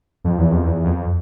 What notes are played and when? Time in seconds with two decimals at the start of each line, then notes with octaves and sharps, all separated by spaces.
0.24 F2
0.38 E2
0.52 F2
0.65 E2
0.85 F2